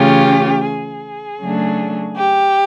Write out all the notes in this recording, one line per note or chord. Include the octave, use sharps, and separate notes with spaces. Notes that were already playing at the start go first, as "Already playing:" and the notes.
Already playing: C#3 E3 A3 C#4 F4 G4
G#4
C#3 F#3 A3 D4
G4